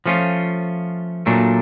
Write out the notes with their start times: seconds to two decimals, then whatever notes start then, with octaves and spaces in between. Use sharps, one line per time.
0.06 F3 A3 C#4 F4
1.26 A#2 F#3 A3 D4